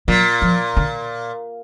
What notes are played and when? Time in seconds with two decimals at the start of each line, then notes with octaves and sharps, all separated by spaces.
0.08 A#2 F#3
0.42 F3
0.77 D3